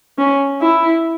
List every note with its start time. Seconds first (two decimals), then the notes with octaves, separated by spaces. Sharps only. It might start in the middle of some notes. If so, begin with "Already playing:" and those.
0.18 C#4
0.61 E4